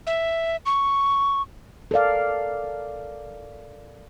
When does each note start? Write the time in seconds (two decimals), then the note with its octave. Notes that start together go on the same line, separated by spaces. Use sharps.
0.07 E5
0.66 C#6
1.91 A4 A#4 D5 F5